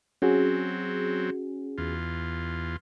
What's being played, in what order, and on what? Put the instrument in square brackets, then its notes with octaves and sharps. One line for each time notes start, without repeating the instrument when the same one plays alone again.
[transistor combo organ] F#3 C4 [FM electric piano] C#4 F#4 G#4
[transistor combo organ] E2 F4